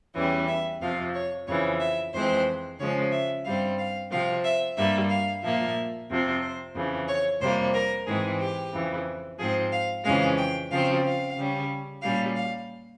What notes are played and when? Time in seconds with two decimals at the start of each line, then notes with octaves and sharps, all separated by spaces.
0.15 E2 E3 G3 C#4
0.48 E5
0.81 F2 C3 F3 F5
1.15 C#5
1.47 F2 C#3 E3 C#5
1.80 E5
2.13 F2 E3 G#3 C4 C5
2.79 C#3 F3 G#3 C#4 C#5
3.12 E5
3.45 G2 G3 C4 F5
3.78 F5
4.11 C3 F3 C4 F5
4.44 E5
4.77 G2 G3 A#3 E5
5.10 F5
5.43 A#2 F3 A#3 E5
6.09 F2 C3 F3 C4
6.42 C5
6.75 F2 C#3 E3
7.08 C#5
7.40 F2 C3 G3 A#3 C5
7.74 A#4
8.06 G#2 E3 G#3 C4 G#4
8.40 G4
8.73 F2 C#3 E3
9.38 G#2 F3 C4 G#4
9.72 F5
10.04 F2 C#3 E3 G#3 C#4 F5
10.37 G5
10.70 C#3 F3 C4 F5
11.03 F5
11.36 C#3 G3 C#4
12.02 A#2 G3 C#4 F5
12.35 F5